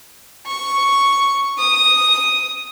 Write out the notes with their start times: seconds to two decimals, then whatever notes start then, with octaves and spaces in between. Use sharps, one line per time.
0.47 C#6
1.59 D#6